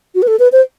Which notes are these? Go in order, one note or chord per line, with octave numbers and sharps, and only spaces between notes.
F#4
B4
A4
B4
C5